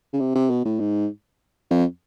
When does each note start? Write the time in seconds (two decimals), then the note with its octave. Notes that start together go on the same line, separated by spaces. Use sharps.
0.13 C#3
0.20 C3
0.36 C3
0.50 B2
0.65 A2
0.80 G#2
1.71 F2